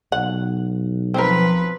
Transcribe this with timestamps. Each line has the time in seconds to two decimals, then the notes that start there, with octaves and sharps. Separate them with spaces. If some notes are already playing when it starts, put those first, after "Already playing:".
0.12 B1 F#5
1.14 F3 C4 A#4 B4